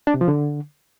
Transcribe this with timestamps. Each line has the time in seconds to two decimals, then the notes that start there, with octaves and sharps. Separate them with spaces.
0.07 D4
0.14 C3
0.21 F3
0.28 D3